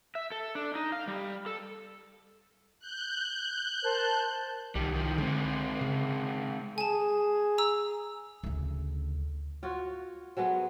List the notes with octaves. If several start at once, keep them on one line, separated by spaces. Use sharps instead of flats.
E5
A4
D4
D#4
F5
G3
A4
F#6 G6
A#4 C5 A5
C2 D#3 G3
D#3 F3
D3 G#3 C4
C#3
G#4 G#5 A5
A#5 E6
D2 C#3
F4 F#4 C#5
F#3 G#3 A3 B3